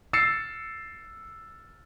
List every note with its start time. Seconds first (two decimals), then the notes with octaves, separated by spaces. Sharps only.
0.13 E6 A6 C7 C#7 E7